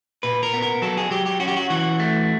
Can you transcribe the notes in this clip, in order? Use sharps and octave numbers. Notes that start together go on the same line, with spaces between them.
A#2 B4
A#4
B3
A#4
F#3 A4
G#4
F#3 G4
G4
C#4 F#4
G4
F#4
E3 F#4
A3